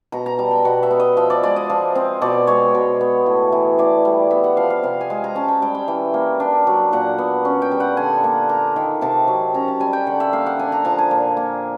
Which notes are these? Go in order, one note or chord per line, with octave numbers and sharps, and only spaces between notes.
B2 A#5
A#5
G3 A5
G5
B2 F#5
E5
B3
D#5
F3 E5
D5
G#3 D5
D#5
F3
C4
B2 D5
G#3 C#5
B2
B3
A2
E3
A2 D5
G3
B3 E5
F#5
F3 F5
F5
C3 F5
G#5
G#3
A#5
C#4 A5
G5
G3 G5
G5
E3
A#3
D4
F#3
A#2 F#5
B3
C#4
G5
G3
F#5
D3 G#5
A#3
A#3 A#5
D#3
C3 A5
F#3
C#4 A#5
A5
G3 G#5
G5
D3 F#5
E5
A#3 F5
F#5
D4 G#5
A#5
F3 A5
G#5
A#2
A#3